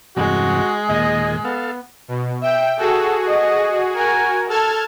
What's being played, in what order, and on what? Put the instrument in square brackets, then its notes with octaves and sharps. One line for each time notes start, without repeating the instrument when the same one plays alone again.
[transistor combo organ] E2 G2 C3 [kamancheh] G#3 [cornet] F#4
[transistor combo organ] D#2 A#2 G#4 [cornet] D#5
[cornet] B3 [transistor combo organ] A4 F5
[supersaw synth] B2
[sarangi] E5 [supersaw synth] G5
[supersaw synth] F#4 G#4 [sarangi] A4
[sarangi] D#5
[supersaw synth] F#4 A#4 [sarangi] G#5
[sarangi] A4 [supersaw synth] A5 F6 G#6